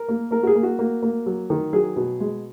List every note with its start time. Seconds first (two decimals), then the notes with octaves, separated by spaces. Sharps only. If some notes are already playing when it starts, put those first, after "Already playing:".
Already playing: A#4
0.09 A#3
0.31 A#3 A#4
0.43 F#4
0.47 G#4
0.55 A#3
0.63 F#4
0.79 A#3
1.02 A#3
1.26 F#3
1.50 D#3
1.73 F#3 G#4
1.96 B2
2.20 G#3